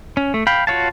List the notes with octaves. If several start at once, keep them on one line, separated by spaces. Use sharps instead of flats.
C#4
A3
F5 G5 B5
F4 F#4 C#5 F5 A5